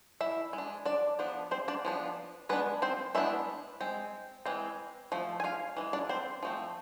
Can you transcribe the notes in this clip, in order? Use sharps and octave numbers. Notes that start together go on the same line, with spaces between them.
E4 E5
G#3
D4
D4 D5
F3 B3 D4
C4 C5
D4 D5
F3 B3 D4
G#3 B3 D4 B4
C4 C5
G#3 B3 D4 E4 E5
G#3 C4
E3 G#3 C4
F3 A3
G#5
F4 F5
E3 G#3
D4 D5
C4 C5
F3 A3 C4